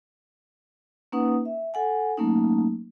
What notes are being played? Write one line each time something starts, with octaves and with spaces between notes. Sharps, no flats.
A#3 C#4 D#4 B4 F#5 D#6
E5
A4 F#5 G#5
F#3 A3 A#3 C#4 D#4